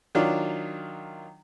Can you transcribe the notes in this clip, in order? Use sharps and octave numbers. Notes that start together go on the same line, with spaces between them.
D#3 F#3 D4 F4